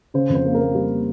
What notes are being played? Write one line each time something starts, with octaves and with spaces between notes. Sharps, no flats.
C#3 C5
F2
C5
A#3
A#4
A#3
G3